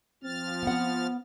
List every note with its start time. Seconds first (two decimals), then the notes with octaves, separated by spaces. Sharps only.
0.23 F3 C4 F6 A6
0.63 B3 F#5